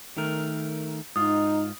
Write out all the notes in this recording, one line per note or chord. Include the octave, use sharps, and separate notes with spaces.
D#3 A3 A#4
G#2 D#4 F4 D#6